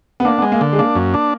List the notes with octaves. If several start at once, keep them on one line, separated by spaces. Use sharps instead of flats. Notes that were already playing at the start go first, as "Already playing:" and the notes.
B3
A#3 D4
G#3 B3
A#3
D3
G#3
A#3 D4
F#2
D4